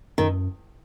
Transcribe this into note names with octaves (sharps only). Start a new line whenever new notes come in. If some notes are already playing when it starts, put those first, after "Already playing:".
F#2 D#3